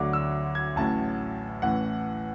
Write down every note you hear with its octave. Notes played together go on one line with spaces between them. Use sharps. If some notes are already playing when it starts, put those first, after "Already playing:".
Already playing: D2 D3 F#3 D6
E6
G#6
A1 A2 F#3 A5
A1 A2 E3 F#5